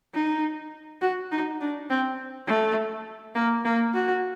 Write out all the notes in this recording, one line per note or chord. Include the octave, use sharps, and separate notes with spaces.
D#4
F#4
D#4
D4
C4
A3
A#3
A#3
F#4